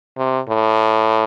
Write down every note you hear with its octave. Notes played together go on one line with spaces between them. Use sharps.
C3
A2